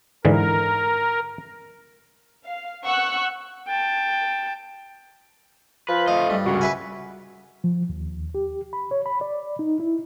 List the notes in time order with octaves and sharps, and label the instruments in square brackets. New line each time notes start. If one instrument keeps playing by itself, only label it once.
[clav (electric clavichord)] G#2 D3 E3 [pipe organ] A#4
[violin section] F5
F#5 C#6 E6 F#6
[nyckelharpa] G5 A5
[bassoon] F3 [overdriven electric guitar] B4
[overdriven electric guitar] A3 D#5 [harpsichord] F5
[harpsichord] G2
[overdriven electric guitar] C2 C#3 [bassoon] F#4
[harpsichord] B4 E5 G#5
[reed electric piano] F3
D#2
G4
B5
C#5
B5
D5
D#4
E4